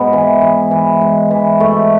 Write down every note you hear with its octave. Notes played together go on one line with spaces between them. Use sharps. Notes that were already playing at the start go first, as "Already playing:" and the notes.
Already playing: G#2 B3
E3
E3
E3
G#2
E3
G#2 A3